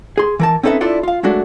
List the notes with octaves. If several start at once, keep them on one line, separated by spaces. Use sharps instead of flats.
G#4 C6
E3 A#4 A5
C4 C#4 D#4 A4 B4 E5
D4 E4 F4 A4 D5 E5
F4 F5
F#3 G#3 A3 D4 F#4